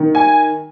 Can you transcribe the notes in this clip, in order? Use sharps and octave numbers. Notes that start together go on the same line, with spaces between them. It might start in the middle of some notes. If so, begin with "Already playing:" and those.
Already playing: D#3
G#5